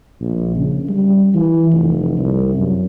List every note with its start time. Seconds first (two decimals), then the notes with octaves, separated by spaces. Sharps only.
0.21 A#1
0.57 C#3
0.89 G3
1.34 E3
1.73 F1
2.18 C2
2.56 F#2